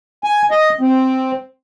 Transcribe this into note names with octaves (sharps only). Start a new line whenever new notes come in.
G#5
D#5
C4